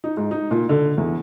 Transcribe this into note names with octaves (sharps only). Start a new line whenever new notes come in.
D#4
G#2
D#4
A#2
D3
E2